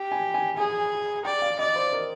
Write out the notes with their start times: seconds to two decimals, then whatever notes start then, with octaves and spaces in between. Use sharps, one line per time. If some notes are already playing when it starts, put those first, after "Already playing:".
Already playing: G4
0.12 G#5
0.34 G#5
0.57 G#4 G#5
1.25 D5 G5
1.42 F5
1.59 D5 D#5
1.76 C5
1.93 A#4